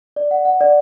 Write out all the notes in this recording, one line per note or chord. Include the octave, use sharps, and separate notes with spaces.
D5
F#5
F#5
D5